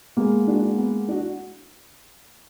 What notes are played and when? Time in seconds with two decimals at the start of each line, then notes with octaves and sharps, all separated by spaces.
0.17 G#3 A#3 B3
0.47 D4 F#4
0.78 B3
1.08 D4 F#4